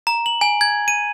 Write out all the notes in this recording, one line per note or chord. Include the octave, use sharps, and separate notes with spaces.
A#5
F#7
G#5
G#6
D#7